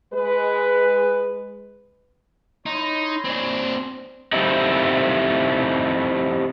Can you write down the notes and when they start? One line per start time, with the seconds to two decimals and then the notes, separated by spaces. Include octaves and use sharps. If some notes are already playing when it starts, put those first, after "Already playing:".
0.14 G#3 B4
2.66 D#4 E4 C#5 C6
3.25 C4 D4
4.33 F3 G3 A3 C4 D#4 E4